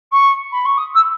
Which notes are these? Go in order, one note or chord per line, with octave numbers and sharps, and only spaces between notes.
C#6
B5
C#6
D#6
E6